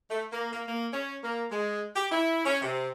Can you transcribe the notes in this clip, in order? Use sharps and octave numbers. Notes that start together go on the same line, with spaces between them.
A3
A#3
A#3
A#3
C#4
A#3
G#3
G4
E4
C#4
C3